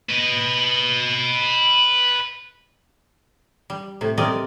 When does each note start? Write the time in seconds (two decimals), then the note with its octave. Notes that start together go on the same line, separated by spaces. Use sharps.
0.09 B4 D#5
3.70 G3
4.01 A2 C3
4.18 C3 G3 C4 A#4 D5 D#5